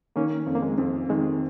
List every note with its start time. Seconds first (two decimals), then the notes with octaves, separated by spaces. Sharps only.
0.16 D#3 A#3 C#4
0.46 F2
0.55 A#3
0.62 G#3 C4
0.78 F2
1.09 D#3 G#3 C4